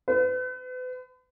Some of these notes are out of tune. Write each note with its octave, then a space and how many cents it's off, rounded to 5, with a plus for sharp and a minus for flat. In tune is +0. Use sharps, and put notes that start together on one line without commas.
B4 +40